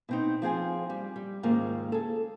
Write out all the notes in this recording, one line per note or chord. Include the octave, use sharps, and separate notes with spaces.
B2 C4 D#4
F3 C4 G#4 G#5
G3
G3
D#2 G#2 C#3 A#3 F4 G#4
G#4 A4